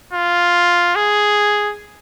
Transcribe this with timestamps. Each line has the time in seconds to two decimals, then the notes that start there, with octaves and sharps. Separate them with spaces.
0.13 F4
0.96 G#4